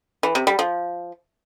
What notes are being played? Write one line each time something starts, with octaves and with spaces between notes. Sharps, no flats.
E3
C3
G3
F3